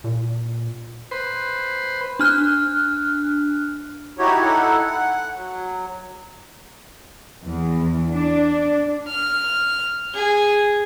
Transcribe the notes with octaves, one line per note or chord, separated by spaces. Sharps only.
A#2
B4 C5
D4 F6 F#6
D#4 E4 F#4 G4 C#5
D#4 E4 A4 F#5
F#5
F#3
E2
D4
F6
G#4